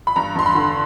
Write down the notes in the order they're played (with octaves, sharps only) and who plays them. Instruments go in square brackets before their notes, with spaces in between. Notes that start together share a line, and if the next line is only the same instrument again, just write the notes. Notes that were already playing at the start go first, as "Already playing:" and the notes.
[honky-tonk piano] B5
G2 A#5
G2 C6
B5
D3